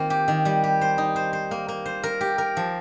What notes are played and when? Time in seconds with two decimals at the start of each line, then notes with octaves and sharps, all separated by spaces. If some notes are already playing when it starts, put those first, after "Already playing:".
Already playing: D#3 A#3 C4 F4
0.10 G4
0.28 D#3
0.45 G3
0.64 G4
0.81 C5
0.98 D#4
1.16 C5
1.33 C5
1.51 A#3
1.68 A#3
1.86 C5
2.04 A#4
2.21 G4
2.38 A#4
2.57 F3